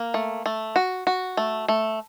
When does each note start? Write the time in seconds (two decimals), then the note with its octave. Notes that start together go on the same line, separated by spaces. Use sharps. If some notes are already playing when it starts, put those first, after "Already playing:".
Already playing: A#3
0.14 A3
0.46 A3
0.76 F#4
1.07 F#4
1.37 A3
1.68 A3